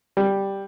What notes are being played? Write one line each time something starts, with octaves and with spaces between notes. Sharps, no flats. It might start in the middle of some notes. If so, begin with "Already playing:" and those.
G3